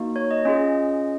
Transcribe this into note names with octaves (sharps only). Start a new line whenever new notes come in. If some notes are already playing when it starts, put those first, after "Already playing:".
Already playing: A#3 D#4 F#4
C#5
D#5
C#4 F4 G#4 D#5